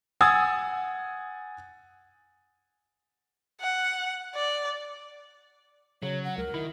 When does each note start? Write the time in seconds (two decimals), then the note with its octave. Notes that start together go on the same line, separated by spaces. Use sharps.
0.21 F#5 G#5 D#6 E6 G#6 A6
3.61 F#5
4.35 D5
6.03 C#3 F#3 C#5
6.24 F#5
6.38 C#2 A#4
6.54 D#3 E4